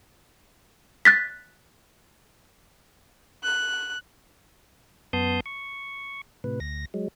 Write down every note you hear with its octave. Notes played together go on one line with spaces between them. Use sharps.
F#6 A6 B6
F#6
F#2 B3 A5 C6 D#6 G6
C#6
A2 C3 B4
D2 A#6
F#3 G#3